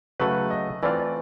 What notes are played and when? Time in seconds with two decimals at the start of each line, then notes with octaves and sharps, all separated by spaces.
0.20 C#3 F#3 A3 B4
0.50 D#5
0.83 E3 A3 C4 F4 D5